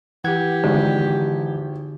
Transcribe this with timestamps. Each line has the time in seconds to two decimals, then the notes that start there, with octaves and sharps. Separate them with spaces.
0.24 E3 G4 F#5 G#6
0.64 G#1 D3